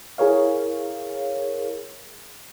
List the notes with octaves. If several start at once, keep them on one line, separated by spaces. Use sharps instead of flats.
E4 G#4 A#4 C#5 F5